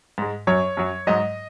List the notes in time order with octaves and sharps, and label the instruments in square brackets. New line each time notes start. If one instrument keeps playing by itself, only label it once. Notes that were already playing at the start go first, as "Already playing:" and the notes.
[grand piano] G#2 G#3
F#2 F#3 C#5
F#2 F#3
G#2 F#3 D#5